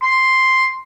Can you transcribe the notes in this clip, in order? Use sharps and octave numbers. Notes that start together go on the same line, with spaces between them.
C6